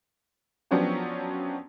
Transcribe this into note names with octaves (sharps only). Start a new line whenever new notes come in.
F3 F#3 B3 C#4 D4 G4